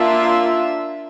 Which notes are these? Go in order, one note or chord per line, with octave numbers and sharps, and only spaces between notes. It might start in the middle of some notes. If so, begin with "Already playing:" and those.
Already playing: A#3 D4 F4 E5